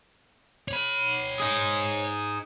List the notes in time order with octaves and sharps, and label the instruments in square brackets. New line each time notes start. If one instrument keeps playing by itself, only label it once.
[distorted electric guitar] C#5 B5
[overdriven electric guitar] D#4 G#4